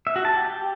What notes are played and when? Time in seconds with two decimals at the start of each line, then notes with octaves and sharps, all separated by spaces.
0.07 E5
0.16 F#4
0.25 A5
0.34 G4